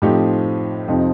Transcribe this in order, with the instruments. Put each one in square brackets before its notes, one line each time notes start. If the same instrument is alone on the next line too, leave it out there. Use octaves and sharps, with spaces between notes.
[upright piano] A2 F3 C4 D#4 G4
F2 C3 F3 C4 D#4